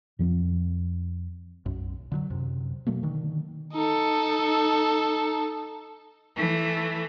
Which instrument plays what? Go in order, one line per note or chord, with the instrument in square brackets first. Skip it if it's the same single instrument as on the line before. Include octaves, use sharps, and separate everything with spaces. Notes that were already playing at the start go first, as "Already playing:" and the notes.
[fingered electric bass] F2 F3 F#3 C4
B1 F#2
D3 E3 F#3
F#2 C3
B2 F#3 A3 A#3
D3 D#3
[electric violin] D#4 A4
[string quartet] E3 A3